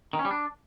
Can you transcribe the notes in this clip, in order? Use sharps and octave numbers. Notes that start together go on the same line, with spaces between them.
D#3
C#4
G3
D4